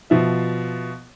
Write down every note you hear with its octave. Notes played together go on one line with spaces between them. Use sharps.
B2 F3 E5